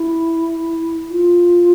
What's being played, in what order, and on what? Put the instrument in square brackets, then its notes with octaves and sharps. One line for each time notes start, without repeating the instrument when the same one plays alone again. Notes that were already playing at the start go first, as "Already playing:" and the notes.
Already playing: [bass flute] E4
F4